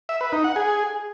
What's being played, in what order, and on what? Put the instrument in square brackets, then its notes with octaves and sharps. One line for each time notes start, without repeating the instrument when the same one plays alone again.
[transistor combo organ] E5
B4
D#4
F#5
G#4